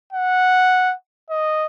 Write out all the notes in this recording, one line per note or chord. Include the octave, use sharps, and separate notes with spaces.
F#5
D#5